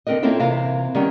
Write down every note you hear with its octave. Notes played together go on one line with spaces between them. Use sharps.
D3 C4 A#4 B4 D#5
A#3 C4 C#4 E4 F4 A4
C3 E3 E4 A#4 F5
D#3 G3 B3 C#4